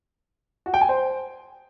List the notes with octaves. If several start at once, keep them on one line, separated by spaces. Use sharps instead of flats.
F#4
G5
G#5
C5